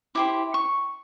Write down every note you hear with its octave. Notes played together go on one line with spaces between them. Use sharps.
E4 G4 C5 D6
C#6